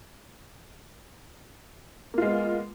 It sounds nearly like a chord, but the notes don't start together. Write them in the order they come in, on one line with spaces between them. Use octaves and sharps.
A#3 F4 G#3 B3